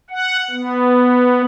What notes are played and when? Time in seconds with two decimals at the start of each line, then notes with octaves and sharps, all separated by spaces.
0.10 F#5
0.50 B3